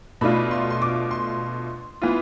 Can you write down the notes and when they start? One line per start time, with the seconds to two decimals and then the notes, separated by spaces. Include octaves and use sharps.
0.21 B2 A3 D4 F4 B5
0.51 C6
0.70 C6
0.82 D6
1.11 C6
2.02 E3 B3 F4